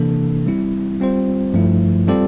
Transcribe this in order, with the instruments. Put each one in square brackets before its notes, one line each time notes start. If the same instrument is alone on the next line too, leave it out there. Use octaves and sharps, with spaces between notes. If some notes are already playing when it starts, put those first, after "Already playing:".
Already playing: [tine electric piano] C3 E3 A#3 D4 A4
G3 C4 E4
G3 C4 F4 C5
G2 F3 A3 E4
G3 C4 F4 A4 D5